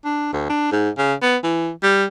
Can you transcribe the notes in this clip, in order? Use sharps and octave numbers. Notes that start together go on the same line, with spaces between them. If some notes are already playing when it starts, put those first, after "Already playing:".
D4
D2
D4
G#2
C#3
B3
E3
G3